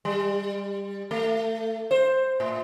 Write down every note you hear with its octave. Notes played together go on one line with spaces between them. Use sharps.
G3
A3
C5
A2